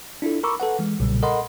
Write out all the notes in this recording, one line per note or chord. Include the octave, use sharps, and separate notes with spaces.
D4 E4 F4 A4
A#4 A#5 B5 C#6 D6 E6
A4 B4 F#5
E3 G#3
B1 A#2 C#3 G3
A4 A#4 D#5 F#5 B5 C6